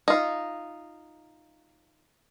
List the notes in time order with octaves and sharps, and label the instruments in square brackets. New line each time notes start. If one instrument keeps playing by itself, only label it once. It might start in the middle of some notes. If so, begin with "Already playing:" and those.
[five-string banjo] D#4 F4